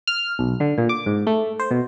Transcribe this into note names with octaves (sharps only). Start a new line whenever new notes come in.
F6
B1
D3
A#2
D6
G#2
A3
C5
B2